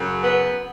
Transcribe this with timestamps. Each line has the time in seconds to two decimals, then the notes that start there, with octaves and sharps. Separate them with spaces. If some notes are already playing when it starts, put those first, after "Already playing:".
Already playing: F#2 C#3 F#3
0.22 B3